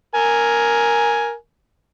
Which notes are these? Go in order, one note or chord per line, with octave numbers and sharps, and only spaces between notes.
A#4 G#5